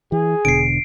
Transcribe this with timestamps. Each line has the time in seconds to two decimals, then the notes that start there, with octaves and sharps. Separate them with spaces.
0.12 E3 G#4
0.45 E1 B2 D3 C7 D7